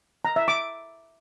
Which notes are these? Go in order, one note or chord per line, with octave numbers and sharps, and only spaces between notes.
A#5
E5
D6